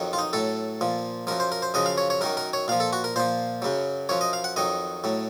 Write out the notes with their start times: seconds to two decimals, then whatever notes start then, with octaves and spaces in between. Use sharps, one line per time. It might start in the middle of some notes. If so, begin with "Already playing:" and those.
Already playing: F2 D#3 F#3
0.13 F4
0.18 D#4
0.33 A2 F#3 A4
0.81 A#2 F3
1.27 F#2 F3 A#4
1.40 C5
1.52 A#4
1.62 C5
1.74 F#2 C#3 F3 D#5
1.86 F5
1.98 C#5
2.10 C#5
2.21 F#2 D#3 F#3 A#4
2.37 A#4
2.53 C#5
2.68 A#2 F3 F5
2.80 A4
2.93 F#4
3.04 A#4
3.16 A#2 F3 C5
3.62 F#2 C#3 F#3
4.09 F#2 F3 C#5
4.21 D#5
4.33 F5
4.44 F#5
4.56 F2 D#3 F#3 D#5
5.04 A2 F#3